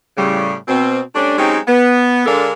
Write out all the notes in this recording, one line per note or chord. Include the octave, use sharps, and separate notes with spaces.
A2 C#3 G3
B2 C4
G3 A3 C#4 D4
F#3 G#3 C4 C#4 D#4 G4
B3
D3 G#3 D4 A4 A#4 F5